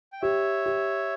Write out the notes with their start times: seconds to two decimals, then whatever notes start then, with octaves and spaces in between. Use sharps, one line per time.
0.12 G5
0.22 G4 C#5 E5
0.66 G4